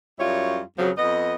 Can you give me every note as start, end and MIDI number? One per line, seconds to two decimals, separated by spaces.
0.18 0.59 42
0.18 0.59 55
0.18 0.59 64
0.18 0.59 65
0.18 0.59 73
0.77 0.89 41
0.77 0.89 49
0.77 0.89 53
0.77 0.89 54
0.97 1.34 41
0.97 1.34 59
0.97 1.34 75